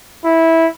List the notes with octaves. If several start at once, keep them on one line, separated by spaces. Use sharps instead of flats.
E4